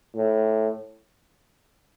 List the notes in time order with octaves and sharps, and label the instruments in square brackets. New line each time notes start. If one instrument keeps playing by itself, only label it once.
[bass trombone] A2